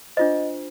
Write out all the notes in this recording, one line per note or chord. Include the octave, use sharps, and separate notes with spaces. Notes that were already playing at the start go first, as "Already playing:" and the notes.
D4 F4 C5 D#5